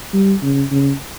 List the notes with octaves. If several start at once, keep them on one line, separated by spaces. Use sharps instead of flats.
G3
C#3
C#3